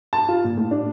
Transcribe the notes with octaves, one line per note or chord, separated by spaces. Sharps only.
A5
F4
A#2
A2
D4